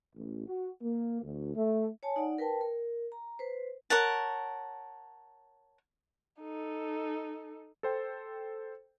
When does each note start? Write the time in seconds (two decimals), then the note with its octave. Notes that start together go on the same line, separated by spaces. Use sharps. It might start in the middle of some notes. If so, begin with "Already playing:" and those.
0.16 A1
0.47 F#4
0.82 A#3
1.23 D2
1.55 A3
2.03 C#5 G#5 A5
2.16 D#4 D5 F#5
2.38 A#4 B4 G5 A5
2.61 A#4
3.12 A#5
3.39 B4 C5
3.90 A#4 C#5 F#5 A5
6.40 D#4 A4
7.83 A4 C5 G5